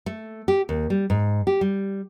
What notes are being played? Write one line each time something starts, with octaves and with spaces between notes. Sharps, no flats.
A3
G4
D#2
G3
G#2
G4
G3